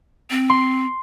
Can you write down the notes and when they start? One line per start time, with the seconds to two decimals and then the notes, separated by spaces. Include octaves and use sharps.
0.31 C4
0.50 C6